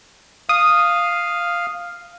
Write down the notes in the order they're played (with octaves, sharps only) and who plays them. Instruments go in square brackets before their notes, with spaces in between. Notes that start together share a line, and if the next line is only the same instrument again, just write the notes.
[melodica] F5 [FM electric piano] D#6